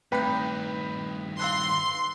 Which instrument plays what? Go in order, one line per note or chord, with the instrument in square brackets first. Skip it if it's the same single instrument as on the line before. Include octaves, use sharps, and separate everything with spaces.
[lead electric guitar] G2 D#3 [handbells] A3 C4 G6 [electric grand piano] B4 G5 B5
[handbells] F5 E6 F#6 [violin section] C6